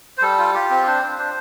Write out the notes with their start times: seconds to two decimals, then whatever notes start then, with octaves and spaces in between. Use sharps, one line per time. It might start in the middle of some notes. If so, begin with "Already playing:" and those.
0.18 C5
0.22 G3 A4
0.39 F4
0.54 F4 G4
0.70 C4
0.87 D4 C5
1.03 D4
1.18 D4 C5